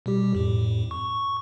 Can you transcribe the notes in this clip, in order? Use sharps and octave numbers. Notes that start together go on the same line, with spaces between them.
B2 G3 G4
F2 A2
C#6